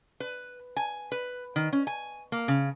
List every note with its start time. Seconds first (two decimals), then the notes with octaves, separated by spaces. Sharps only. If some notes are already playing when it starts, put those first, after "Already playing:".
0.20 B4
0.76 G#5
1.12 B4
1.56 D#3
1.73 C#4
1.87 G#5
2.32 A#3
2.48 C#3